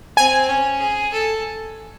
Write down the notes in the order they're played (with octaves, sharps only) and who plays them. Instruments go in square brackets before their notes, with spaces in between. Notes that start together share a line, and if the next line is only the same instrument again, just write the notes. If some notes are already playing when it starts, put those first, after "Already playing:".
[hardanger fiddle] C4 [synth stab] G#5
[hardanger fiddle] C#4
G#4
A4